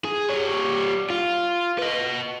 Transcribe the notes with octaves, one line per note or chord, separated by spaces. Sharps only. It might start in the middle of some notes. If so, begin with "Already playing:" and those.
G#4
G3 C#5
F4
B4 D#5